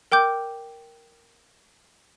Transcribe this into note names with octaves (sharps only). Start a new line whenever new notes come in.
A#4 G5 D6 G6